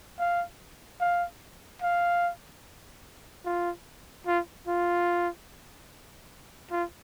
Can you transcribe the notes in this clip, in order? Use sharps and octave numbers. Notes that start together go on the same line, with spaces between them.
F5
F5
F5
F4
F4
F4
F4